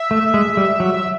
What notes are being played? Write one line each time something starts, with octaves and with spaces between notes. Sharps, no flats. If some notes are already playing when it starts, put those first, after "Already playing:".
Already playing: E5
A3
G#3
G3
F#3